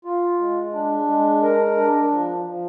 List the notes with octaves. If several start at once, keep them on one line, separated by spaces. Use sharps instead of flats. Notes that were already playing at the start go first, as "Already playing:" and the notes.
F4
G#3
D4
G#3
A#4
D4
F3
F3